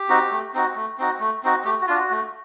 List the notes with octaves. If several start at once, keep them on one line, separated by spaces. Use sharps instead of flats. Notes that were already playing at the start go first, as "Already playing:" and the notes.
Already playing: G4
C4 D#4 F#4
A3
C4 D#4 F#4
A3
C4 D#4 F#4
A3
C4 D#4 F#4
A3 G4
F#4
D4 F4
F#4
A3